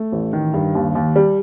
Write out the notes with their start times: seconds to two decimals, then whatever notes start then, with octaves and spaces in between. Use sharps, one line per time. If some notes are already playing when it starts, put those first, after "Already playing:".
Already playing: A3
0.12 A1
0.33 D#3
0.54 G2
0.75 D#2
0.95 D#2
1.16 G3